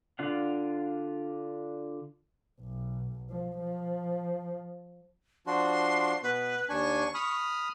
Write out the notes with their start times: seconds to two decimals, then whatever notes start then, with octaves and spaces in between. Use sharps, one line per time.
0.19 D3 D4 F4 F5 F#5
2.60 B1
3.30 F3
3.59 F3
5.47 F3 D4 F#4 C6
6.23 B2 B3 B4
6.69 D#2 D4 G#5 C#6
7.15 B5 D#6 F6